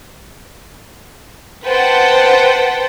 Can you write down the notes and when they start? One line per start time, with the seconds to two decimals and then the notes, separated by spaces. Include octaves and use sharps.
1.65 B4 C5 F#5 G5 A5